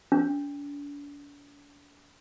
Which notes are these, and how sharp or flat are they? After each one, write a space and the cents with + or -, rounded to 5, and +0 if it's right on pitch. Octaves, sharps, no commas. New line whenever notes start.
D4 -40